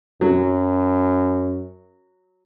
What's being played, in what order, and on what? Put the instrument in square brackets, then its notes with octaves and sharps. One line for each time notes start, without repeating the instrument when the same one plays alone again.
[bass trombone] F#2 [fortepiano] F#3